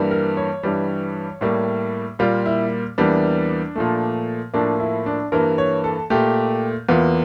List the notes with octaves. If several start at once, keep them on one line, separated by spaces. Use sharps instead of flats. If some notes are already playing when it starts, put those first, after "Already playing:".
Already playing: G2 E3 G3 A#3
A#4
C#5
G2 E3 G3
A2 G3 A#3
A#2 G3 A#3 F4
E4
E2 E3 G3 A#3 D4
A#2 F3 A3
A2 F3 A#3 D4
E4
D4
G2 E3 A#3 A#4
C#5
A4
A#2 A3 G4
E2 E3 A#3 F4